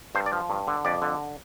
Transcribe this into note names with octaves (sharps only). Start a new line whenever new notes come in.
G2 C5
D5
F3
G2
D3
F2 D5
D3